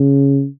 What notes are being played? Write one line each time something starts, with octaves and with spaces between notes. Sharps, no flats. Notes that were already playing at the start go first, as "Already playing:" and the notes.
Already playing: C#3